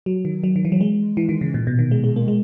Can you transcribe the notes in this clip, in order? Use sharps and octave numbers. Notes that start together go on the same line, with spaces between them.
F#3
D#3
F#3
D#3
E3
F#3
G#3
E3
D#3
C#3
A#2
B2
D#3
G#3
G#3
A#3
G#3